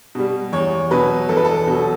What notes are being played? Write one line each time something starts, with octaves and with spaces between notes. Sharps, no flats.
B2 G3
E2 C#5
B2 F#3 B4
E2 A4
B4
A4
B2 F#3